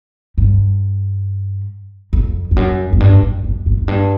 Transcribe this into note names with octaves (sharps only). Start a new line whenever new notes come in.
G2
F2
F2
F#2
F#2
G2
F#2
F#2
F#2
F#2
G2